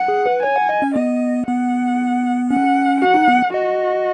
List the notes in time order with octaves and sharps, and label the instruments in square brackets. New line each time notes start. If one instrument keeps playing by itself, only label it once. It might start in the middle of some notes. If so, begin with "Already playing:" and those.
Already playing: [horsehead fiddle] F#5
[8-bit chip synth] G#4
B4
[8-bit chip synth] C#5 [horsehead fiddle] G#5
[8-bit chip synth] F#5
D#5
C#4
[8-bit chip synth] B3 [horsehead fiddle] D#5
[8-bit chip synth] B3 [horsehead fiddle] F#5
[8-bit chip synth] C#4 [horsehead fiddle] F#5
[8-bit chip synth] F#4 [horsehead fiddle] F#5
[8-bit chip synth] D#4
B3
[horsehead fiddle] F#4 [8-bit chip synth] D#5